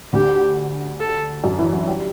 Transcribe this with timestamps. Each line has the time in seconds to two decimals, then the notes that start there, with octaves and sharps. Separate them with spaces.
0.13 D2 D3 G4
1.00 A4
1.44 F#2 F#3
1.59 E3 E4
1.73 F#3 F#4
1.87 G3 G4